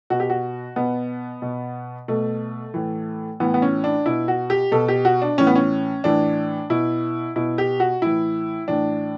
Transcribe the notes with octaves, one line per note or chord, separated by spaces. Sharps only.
B2 F#4
G4
F#4
B2 B3
B2
B2 A3
A2 E3
A2 E3 B3
B3
C#4
D4
B2 E4
F#4
G4
B2 A4
G4
F#4
D4
A2 E3 C#4
B3
C#4
A2 E3 D4
B2 E4
B2 E4
G4
F#4
A2 E3 E4
A2 E3 D4